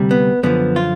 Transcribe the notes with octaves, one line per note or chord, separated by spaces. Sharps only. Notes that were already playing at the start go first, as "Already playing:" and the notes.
Already playing: D2 C3 G3
B3
F#2 D3 F3 B3
F4